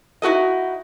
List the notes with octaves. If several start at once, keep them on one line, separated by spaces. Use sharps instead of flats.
D#4 E4 F#4 A4 D#5